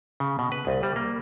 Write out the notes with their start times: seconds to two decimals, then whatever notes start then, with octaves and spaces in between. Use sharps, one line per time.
0.20 C#3
0.39 B2
0.52 B4
0.67 C2
0.83 G3
0.96 A#3